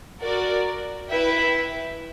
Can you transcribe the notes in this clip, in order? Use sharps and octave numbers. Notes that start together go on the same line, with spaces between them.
F#4 A#4 D5
E4 B4 E5 G5